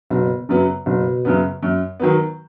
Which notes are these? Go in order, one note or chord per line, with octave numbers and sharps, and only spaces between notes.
F#1 B2
F#2 C#3 F#3 B3
F#1 B2
F#2 C#3 F#3 B3
F#2
D#3 F#3 B3